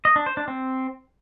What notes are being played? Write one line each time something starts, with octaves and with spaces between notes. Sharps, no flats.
D#5
D4
C5
D4
C4